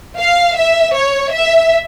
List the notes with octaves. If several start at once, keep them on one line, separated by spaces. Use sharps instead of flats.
F5
E5
C#5
E5